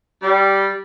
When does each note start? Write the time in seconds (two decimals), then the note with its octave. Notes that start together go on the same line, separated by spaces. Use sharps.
0.22 G3